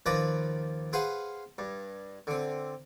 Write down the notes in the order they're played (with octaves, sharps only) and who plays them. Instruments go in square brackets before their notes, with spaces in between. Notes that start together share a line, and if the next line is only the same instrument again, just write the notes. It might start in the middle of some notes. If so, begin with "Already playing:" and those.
[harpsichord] D#2 F3 B4 D5 A#5 B5
G#4 B4 C5 F5 F#5
G2
D3 C4